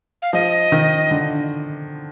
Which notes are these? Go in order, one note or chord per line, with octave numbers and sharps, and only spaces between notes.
F5
F3 D#5
D#3
D3